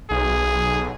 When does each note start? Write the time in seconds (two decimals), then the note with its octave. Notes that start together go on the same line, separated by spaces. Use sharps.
0.11 B1 G#4